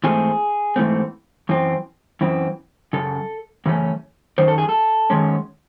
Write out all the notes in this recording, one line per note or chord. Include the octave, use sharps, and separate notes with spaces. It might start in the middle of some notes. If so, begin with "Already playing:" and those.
G#2 E3 A3 C4 G#4
G#2 E3 A3 C4
F#2 E3 C4
F#2 E3 C4
F#2 C#3 A4
F#2 C#3 E3 A3 C#4
F#2 D#3 C5
A4
G#4
A4
F#2 D#3 G#3 C#4